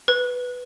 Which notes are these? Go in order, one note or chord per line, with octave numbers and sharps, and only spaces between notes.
B4